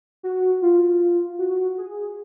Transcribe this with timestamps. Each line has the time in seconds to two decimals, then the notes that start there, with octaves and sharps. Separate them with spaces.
0.23 F#4
0.62 F4
1.39 F#4
1.78 G#4